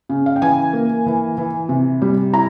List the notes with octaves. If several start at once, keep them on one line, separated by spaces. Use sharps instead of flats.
C#3
F5
G5
E3 G#5
A#3
E3
E3
C3
G3
E4 A#5